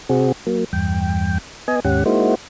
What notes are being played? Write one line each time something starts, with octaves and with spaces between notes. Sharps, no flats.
C3 C4 F#4 G#4
F#3 A#3
E2 G2 G5
B3 D#5 G#5
D#2 G#2 C#4 G4 F#5
G#3 A#3 D#4 E4 F#4 C5